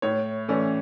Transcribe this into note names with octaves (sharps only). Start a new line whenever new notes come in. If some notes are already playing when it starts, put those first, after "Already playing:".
A2 C#5
E3 A3 C#4 D5